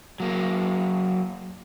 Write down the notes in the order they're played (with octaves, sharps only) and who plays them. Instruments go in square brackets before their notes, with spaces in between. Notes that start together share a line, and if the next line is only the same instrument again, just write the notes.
[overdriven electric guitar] F#3 A#3